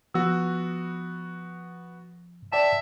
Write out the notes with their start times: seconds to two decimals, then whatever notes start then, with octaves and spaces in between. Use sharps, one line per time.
0.14 F3 B3 F#4 E6
2.52 D5 E5 G5 A5